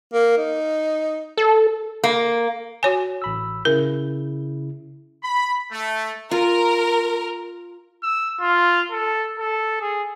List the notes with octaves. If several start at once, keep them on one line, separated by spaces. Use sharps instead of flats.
A#3
D#4
A4
A#3
F#4 C#5 G#5
A1 B5 E6
C#3 E4 A#4
B5
A3
F4 A#4
E6
F4
A4
A4
G#4